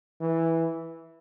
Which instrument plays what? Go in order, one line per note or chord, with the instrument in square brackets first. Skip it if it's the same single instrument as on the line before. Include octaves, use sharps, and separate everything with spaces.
[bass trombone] E3